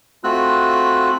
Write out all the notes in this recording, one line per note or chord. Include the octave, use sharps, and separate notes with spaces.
A3 C4 F4 F#4 E6 F#6